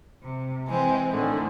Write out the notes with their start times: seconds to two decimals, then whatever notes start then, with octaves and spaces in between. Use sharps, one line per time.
0.23 C3
0.68 E3 G#3 C4
1.11 A2 D3 D#3